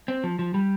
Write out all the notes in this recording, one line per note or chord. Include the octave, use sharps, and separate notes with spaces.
C4
F3
F3
G3